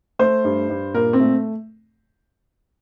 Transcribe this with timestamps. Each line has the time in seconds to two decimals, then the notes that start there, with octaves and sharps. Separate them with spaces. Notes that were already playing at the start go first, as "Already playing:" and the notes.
0.19 A3 C5
0.44 G2
0.70 G2
0.94 A#2 A#4
1.13 C4
1.20 A3